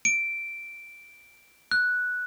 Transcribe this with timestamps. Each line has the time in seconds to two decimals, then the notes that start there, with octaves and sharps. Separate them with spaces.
0.05 D7
1.71 F#6